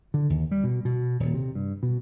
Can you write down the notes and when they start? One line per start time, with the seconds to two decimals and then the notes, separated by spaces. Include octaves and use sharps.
0.14 D3
0.30 D#2
0.51 G3
0.64 B2
0.85 B2
1.20 D#1
1.34 C3
1.55 G2
1.83 B2